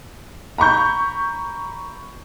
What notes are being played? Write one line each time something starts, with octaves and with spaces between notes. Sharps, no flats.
A#5 B5 C#6 G6